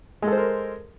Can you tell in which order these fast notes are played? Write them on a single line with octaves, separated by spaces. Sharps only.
G#3 A4 C5 A#4